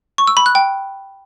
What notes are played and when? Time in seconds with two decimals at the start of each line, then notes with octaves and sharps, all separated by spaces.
0.18 C#6
0.27 E6
0.37 B5
0.46 F#6
0.55 G5